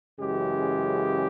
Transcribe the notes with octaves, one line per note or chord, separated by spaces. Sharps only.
F#2 C#3 E3 G#3 G4